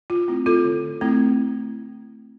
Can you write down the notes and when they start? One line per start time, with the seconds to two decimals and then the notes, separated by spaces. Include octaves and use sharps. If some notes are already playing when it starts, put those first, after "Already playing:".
0.10 F4
0.28 A3 C4 E4
0.46 F4 A4
0.65 D3
1.01 A3 C4 E4